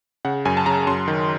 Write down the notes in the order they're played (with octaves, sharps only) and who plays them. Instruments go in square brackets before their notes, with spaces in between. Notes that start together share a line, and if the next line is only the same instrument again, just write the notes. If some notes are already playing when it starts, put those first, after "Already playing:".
[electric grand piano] C#3 F#5
F#2 G#5
A5
C#3 A#5
F#2 C6
D#3